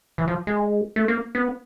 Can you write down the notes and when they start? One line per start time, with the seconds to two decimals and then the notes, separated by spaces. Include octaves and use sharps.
0.18 E3
0.28 F3
0.47 G#3
0.96 A3
1.08 A#3
1.35 B3